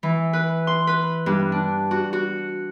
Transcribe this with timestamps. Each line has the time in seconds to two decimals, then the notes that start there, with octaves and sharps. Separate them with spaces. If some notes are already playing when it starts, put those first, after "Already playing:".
0.03 E3
0.33 B4
0.67 C6
0.87 B4
1.26 G2
1.52 D4
1.91 F#4
2.13 F#4